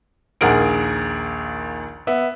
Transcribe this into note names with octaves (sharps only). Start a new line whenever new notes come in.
A#1 D#2 G#4 A#4 F#5 D7
B3 E5